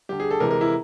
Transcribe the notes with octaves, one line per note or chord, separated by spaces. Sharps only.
D3 G3 G4
G#4
A4
C3 E3 G#3 A#4
A#4
E4